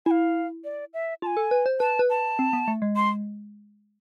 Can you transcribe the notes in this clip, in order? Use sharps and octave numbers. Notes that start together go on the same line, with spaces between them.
E4 F5 G#5
D5
E5
F4 A5
G#5
A4
B4
C5
B4 A5
B4
A5
C4
B3
A3
G#3
C6